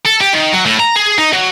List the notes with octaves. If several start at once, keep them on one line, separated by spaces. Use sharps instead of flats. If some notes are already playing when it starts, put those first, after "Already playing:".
A4
G4
D#3
F#3
A2
A#5
G#4
D#4
F#3